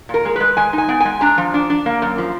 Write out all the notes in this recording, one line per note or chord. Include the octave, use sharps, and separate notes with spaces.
A#2 A#4
G#3
G#3 B4
G#3 G#5
D#4 G#5
B3
G#3 G#5
D4 A#5
F3
D4
D4
A#3
F#2
F3